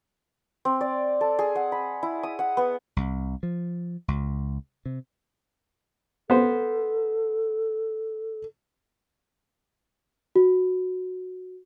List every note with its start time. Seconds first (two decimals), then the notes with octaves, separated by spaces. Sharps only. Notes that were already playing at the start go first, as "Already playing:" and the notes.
0.65 C4
0.81 D5
1.21 A4
1.39 G#4
1.55 F#5
1.72 B5
2.03 E4
2.23 D#6
2.39 F#5
2.57 B3
2.97 C2
3.43 F3
4.08 C#2
4.86 C3
6.30 B3 A4 C5
10.36 F#4